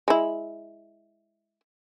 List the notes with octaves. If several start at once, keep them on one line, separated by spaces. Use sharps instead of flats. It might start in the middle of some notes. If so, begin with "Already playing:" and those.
G#3 E4